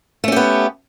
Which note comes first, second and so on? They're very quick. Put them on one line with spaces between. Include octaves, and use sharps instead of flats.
A3 C#4 G4 B3